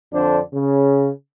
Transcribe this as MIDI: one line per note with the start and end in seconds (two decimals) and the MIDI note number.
0.13 0.39 41
0.13 0.39 50
0.13 0.39 62
0.13 0.39 72
0.53 1.10 49